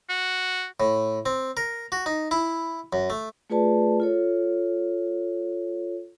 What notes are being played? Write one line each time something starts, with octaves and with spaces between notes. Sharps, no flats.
F#4
A2
C4
A#4
F#4
D#4
E4
F#2
A3
A3 F4 G#4 B4 D5 A5
F4 A4 C#5